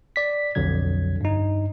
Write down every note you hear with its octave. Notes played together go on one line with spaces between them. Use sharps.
D5 B6
B1 F2 D3 F#3 G#6
G2 D#4